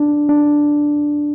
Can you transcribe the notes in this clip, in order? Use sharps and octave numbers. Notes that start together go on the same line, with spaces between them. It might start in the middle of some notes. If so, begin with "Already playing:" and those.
Already playing: D4
D4